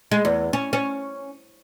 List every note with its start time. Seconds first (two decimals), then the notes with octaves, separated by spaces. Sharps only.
0.11 G#3
0.25 E2
0.53 C#4
0.73 C#4